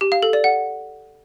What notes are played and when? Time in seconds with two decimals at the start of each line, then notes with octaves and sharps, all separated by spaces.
0.01 G4
0.12 F5
0.23 A4
0.33 D5
0.44 F#5